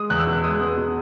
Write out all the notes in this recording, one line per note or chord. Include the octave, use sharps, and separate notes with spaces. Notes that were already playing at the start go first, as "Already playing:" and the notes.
Already playing: G#3 D#6
E2 F#6
E6
B2
G#3 D#6
B3
B2